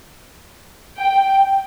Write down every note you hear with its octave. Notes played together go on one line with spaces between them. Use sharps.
G5